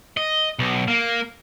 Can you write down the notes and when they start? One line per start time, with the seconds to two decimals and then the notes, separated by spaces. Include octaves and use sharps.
0.17 D#5
0.59 B1
0.88 A#3